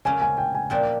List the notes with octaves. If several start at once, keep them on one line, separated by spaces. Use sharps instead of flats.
C#3 F#3 A#3 C#4 G#5
G#5
G5
G#5
A#2 F3 A#3 D4 G5